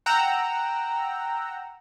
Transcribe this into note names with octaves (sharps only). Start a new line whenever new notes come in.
F#5 G5 A#5 E6